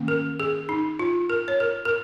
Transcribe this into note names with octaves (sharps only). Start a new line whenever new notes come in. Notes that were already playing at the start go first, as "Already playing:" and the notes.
Already playing: D#3 A#3 C#4
A#4
G#4
D#4
F4
A#4
C#5
A#4
A#4